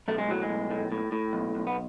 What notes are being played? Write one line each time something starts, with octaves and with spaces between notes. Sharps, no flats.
B1 A3
G#3
A2 F#3
G#3
B1
A2
A2
A2
B1
B1
B3